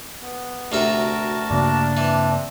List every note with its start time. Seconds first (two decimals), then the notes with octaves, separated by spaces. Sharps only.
0.21 B3
0.72 D2 C3 F#4 A#4 E5 A5
1.50 G2 C#3 A#3 D4
1.97 E3 C4